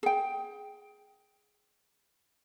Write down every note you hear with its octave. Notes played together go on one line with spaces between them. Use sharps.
G#4 G5